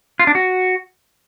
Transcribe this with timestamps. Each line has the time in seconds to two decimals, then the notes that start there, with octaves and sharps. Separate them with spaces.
0.19 F4
0.27 D4
0.35 F#4